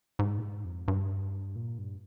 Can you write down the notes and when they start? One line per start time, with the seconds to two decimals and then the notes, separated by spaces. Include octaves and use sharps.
0.19 G#2
0.38 A#2
0.42 G#2
0.65 F2
0.88 G2
1.56 A#2
1.78 G2